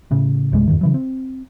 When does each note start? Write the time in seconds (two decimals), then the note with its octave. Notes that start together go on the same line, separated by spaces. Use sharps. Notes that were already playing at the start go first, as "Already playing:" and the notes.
0.11 A2 C#3
0.52 B1 G2 C3 G#3
0.68 E2 G2 D#3
0.81 C#3 E3 F#3
0.94 C4